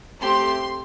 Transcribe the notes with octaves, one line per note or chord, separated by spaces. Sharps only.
A3 C4 G4 C6